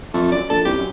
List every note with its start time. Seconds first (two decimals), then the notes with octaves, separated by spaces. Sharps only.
0.14 F2 A3
0.32 F#2 D5
0.50 A#1 A4
0.65 C2 G4
0.78 F#2